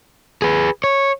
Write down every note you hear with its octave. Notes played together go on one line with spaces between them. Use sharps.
G#4 B4
C#5